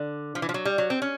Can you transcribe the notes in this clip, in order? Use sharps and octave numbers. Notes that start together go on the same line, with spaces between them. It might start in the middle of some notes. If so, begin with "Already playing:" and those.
Already playing: D3
F3
E3
F3
F#3
G3
F#3
C4
C#4